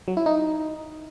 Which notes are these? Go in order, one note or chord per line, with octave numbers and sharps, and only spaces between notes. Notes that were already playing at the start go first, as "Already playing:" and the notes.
F#3
E4
D#4